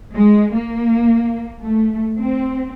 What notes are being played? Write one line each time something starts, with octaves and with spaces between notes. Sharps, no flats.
G#3
A#3
A3
C4